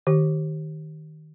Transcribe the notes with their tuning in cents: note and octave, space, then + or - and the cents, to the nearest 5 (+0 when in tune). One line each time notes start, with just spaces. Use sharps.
D#3 +0 G4 -20